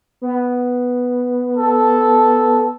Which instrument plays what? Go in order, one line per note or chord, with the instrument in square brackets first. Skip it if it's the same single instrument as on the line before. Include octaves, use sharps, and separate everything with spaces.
[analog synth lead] B3
[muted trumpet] A4